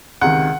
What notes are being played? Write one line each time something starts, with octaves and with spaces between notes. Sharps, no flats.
C#2 C3 D#3 F#5